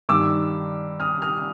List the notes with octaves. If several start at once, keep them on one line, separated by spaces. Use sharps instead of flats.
G2 D#3 G3 D6 E6
D#6 F6
D#6 F6